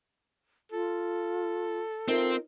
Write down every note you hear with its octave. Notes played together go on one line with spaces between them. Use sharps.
F4 A4
C4 D#4 F4 A#4 D#5